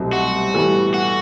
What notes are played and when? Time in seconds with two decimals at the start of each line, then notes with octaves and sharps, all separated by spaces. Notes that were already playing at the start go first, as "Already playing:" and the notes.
Already playing: C2 B2 F#3 A3 C4
0.13 F#4
0.54 A2 E3 G3 B3
0.94 F#4